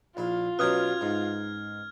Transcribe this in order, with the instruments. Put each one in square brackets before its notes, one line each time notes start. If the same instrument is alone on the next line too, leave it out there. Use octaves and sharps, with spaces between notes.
[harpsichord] A#1 E4 [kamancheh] F4
[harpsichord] B2 F#3 [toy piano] C#4 B4 D#6 [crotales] F6 G#6
[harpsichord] G#2